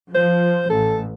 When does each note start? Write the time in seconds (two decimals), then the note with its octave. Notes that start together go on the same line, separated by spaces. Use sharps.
0.15 F3 C5
0.70 A1 A4